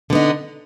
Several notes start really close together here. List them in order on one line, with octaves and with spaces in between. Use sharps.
D3 B3 D#4